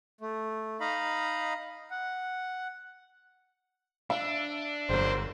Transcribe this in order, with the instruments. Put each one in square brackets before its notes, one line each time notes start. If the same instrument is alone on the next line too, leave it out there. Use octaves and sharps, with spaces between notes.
[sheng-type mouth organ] A3
D#4 D#5 F5 A#5 B5
F#5
[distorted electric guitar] D4 [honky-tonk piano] E5
[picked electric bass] G1 [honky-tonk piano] C#2 F#2 [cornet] C5